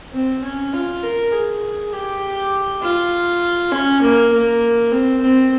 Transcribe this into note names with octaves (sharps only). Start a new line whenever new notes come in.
C4
C#4
F4
A#4
G#4
G4
F4
C#4
A#3
A#3
C4
C4